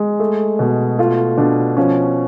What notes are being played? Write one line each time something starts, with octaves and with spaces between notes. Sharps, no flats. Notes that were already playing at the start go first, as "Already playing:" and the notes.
Already playing: G#3
A3
B2
A3 F4
B2 D4
F3 C#4